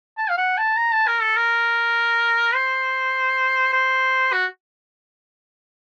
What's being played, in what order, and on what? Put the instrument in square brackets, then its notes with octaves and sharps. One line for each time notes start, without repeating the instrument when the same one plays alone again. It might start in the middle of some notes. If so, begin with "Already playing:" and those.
[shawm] A5
F5
F#5
A5
A#5
A5
A#4
A4
A#4
C5
C5
F#4